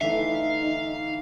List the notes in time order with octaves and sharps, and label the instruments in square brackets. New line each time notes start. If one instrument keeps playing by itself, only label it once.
[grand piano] D3 E3 A3 [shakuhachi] D#4 [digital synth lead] E5 [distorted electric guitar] F5